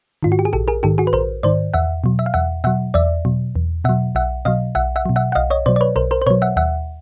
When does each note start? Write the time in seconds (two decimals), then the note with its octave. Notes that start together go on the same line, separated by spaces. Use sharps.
0.23 G#2 D#3 F4
0.32 F#4
0.39 G4
0.45 G#4
0.53 A#1 G4 A4
0.68 G#4 A#4
0.83 G#2 D#3 G4 A4
0.98 F#4 G#4
1.07 B4
1.13 A#1 A#4 C5
1.43 G#2 D#3 C5 D5
1.74 E2 E5 F#5
2.04 B2 F#3
2.19 E5
2.26 F5
2.34 E2 E5 F#5
2.64 B2 F#3 E5 F#5
2.94 E2 D5 E5
3.25 B2 F#3
3.56 E2
3.84 B2 E5 F#5
3.89 F#3
4.15 B1 E5 F#5
4.45 B2 F#3 D#5 F5
4.75 B1 E5 F#5
4.96 E5 F#5
5.06 B2 F#3
5.16 E5 F#5
5.32 F#5
5.35 B1 D#5 F5
5.50 C#5 D#5
5.66 B2 F#3 C5 D5
5.76 D5
5.81 B4 C#5
5.96 B1 A#4 C5
6.11 A#4 C5
6.22 C5
6.26 B2 B4 C#5
6.30 F#3
6.42 E5 F#5
6.57 D#2 E5 F#5